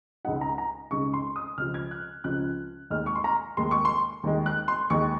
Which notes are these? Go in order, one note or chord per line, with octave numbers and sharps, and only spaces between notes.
C#2 C#3 G#3 D#4 F#5
A#5
A#5
C#2 C#3 G#3 D#4 C#6
C6
D#6
C#2 C#3 F3 F6
G#6
F#6
C#2 C#3 F3 F#6
D#2 D#3 G#3 F6
C#6
C6
A#5
D#2 D#3 G#3 C6
C#6
C6
D#2 D#3 G#3
F#6
C6
D#2 D#3 G#3 C#6